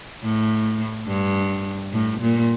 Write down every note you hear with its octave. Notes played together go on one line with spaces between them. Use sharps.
A2
G2
A2
A#2